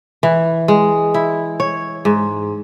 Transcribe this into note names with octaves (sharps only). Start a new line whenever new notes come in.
E3
G#3
E4
C#5
G#2